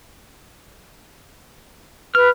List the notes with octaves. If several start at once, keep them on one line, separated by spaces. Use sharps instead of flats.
B4 F6